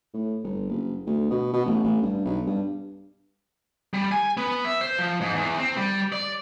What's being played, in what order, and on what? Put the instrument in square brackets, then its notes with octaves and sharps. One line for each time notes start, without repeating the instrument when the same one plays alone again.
[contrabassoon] A2
G1
F#1
D2
B2
B2
A1
A1
G2
B1
G2
[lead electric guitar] G3
G#5
B3
E5
C5
F3
G#2
E2
C4
G3
D5